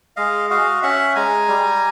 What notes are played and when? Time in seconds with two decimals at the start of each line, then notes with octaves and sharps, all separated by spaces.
0.17 G#3 D#5 F5
0.50 F#4 D#5 F5
0.82 C#4 E5 F#5
1.15 G#3 G#5 A#5
1.48 G3